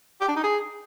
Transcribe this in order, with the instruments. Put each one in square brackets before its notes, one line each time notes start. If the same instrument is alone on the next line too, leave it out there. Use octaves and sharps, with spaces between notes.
[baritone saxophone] G4
D4
D#4
G#4